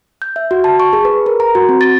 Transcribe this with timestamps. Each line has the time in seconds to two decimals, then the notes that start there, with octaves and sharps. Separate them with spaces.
0.22 G6
0.36 E5
0.51 F#4
0.64 A5
0.80 C#6
0.93 G#4
1.05 B4
1.26 A#4
1.40 A#5
1.55 F#4
1.69 C4
1.81 A6